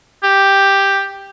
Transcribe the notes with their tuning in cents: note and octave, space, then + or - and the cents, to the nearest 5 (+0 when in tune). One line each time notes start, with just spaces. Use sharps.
G4 +5